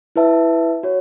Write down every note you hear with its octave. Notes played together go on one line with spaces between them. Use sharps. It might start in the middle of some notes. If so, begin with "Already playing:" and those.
E4 B4 E5 A5
F#4 C#5